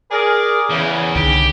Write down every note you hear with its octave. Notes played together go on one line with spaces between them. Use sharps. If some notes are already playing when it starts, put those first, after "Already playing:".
G#4 A#4 D5
E2 C#3 E3
C2 D3 D#3 G4